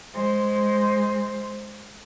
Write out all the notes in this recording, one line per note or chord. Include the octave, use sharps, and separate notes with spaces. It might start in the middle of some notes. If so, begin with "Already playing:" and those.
G#3 C5